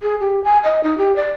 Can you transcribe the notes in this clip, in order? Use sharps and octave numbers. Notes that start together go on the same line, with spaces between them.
G#4
G4
G#5
D#5
D#4
G4
D5